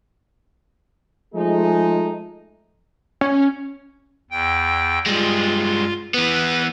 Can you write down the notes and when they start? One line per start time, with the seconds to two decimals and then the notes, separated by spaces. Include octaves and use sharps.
1.35 F3 G#3 A3 D#4
3.21 C#4
4.31 E2 G5
5.06 G2 G#3 F4
6.14 E3 B3 B4